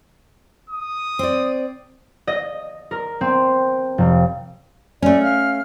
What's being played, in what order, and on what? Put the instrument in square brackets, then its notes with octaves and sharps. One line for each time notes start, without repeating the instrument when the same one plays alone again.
[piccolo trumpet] D#6
[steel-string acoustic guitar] C4 D5
[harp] D#5
A#4
C4
F1
[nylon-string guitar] A3 C#4 [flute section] D5
[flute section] F5 F6